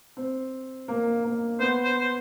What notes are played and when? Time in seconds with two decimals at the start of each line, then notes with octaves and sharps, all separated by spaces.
0.17 C4
0.88 A#3
1.24 A#3
1.60 B3 C5
1.84 C5
2.00 C5